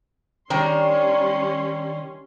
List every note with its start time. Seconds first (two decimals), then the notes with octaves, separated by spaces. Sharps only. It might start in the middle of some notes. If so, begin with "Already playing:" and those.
0.50 D#3 G3 C#4 D4 A#5 C6